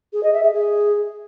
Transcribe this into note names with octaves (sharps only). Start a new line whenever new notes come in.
G#4
D#5
E5
G#4
G#4